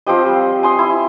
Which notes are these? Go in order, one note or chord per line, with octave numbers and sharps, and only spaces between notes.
F3 C4 G4 D#5
G3
G#5 C6 D#6
E4